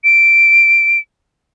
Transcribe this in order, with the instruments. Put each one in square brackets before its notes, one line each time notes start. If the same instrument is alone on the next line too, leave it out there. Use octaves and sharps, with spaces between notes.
[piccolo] D7